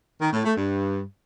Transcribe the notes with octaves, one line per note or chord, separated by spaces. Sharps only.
D#3
A2
A3
G2